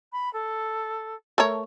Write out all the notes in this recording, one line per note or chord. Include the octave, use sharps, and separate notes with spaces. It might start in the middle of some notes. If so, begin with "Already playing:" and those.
B5
A4
A3 A#4 C#5